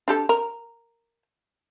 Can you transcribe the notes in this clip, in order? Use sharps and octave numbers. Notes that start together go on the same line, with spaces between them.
D4 G4 A4
A#4